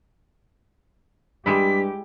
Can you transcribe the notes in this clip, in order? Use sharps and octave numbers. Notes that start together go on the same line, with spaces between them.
G2 G3 G#3 E4 G4 B6